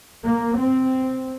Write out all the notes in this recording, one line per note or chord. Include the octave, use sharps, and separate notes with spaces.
A#3
C4